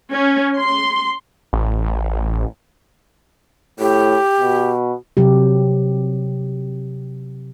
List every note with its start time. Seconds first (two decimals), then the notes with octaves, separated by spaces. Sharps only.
0.13 C#4
0.59 C6
1.53 A1
3.80 A2 G4
4.41 B2
5.17 C3 F#3 G4